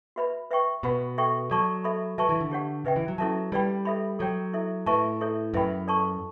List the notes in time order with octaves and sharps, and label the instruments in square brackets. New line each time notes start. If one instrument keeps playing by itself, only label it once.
[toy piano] F#4 B4 E5 B5
B4 E5 G5 C#6
[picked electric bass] B2 [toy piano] F#4 B4 F#5 B5
[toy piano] A4 E5 G5 C#6
[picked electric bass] F#3 [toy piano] A4 D5 A5 C#6
[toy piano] A4 E5 B5
[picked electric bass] F#3 [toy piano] B4 E5 A5 C#6
[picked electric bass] E3
D3
[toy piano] G4 C#5 F#5
[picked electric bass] C#3 [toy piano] B4 E5 G5
[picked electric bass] E3
F#3
[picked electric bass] F#3 [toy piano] C#4 E4 A4 E5 A5
[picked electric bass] G3 [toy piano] B4 D5 G5 B5
[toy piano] A4 E5 B5
[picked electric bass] F#3 [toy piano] A4 C#5 G5
[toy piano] E4 A4 E5
[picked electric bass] A2 [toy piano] B4 E5 A5 C#6
[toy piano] E4 A4 C#5 E5
[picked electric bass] F#2 [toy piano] E4 B4 E5 G5 B5
[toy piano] A4 D5 A5 C#6